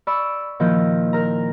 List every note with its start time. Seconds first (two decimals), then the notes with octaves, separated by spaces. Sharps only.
0.07 D5 B5 C#6 E6
0.60 A#2 D#3 F3 E4 G6
1.13 A#4 A#5